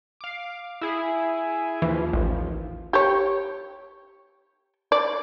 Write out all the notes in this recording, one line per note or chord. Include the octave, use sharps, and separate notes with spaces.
F5 D6
E4 G#4
D#2 E3 F3
A1
G4 C#5
D5